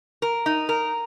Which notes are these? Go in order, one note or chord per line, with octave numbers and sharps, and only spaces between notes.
A#4
D#4
A#4